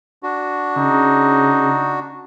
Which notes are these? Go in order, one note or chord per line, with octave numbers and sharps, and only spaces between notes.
D4 F#4
C#3 D#4